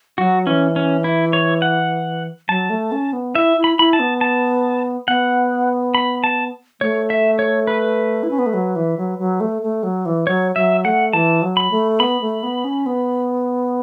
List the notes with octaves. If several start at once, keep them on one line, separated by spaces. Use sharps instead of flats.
F#3 F#4
E3 C#4
C#4
E4
C#5
F#5
F#3 A5
A3
C#4
B3
E4 E5
E4
B5
E4 B5
A5
B3
A5
B3 F#5
B5
A5
A3 C#5
E5
C#5
B4
E4
C#4
B3
A3
F#3
E3
F#3
F#3
A3
A3
F#3
E3
F#3 C#5
F#3 E5
A3 F#5
E3 A5
F#3
B5
A3
B3 B5
A3
B3
C#4
B3